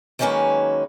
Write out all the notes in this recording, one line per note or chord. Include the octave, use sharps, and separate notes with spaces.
D#3 F#3 G#3 A#3 C#4 B4